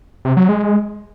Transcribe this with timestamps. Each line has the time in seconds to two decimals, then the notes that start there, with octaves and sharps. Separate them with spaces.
0.25 C3
0.37 F#3
0.49 G#3